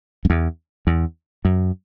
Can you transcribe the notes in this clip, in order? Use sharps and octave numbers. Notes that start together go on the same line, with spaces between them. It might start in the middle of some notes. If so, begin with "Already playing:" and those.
F#2
E2
E2
F#2